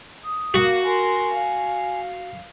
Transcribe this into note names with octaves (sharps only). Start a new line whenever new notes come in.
D#6
A#3 F#4 F5
A#4 G#5 C6
F5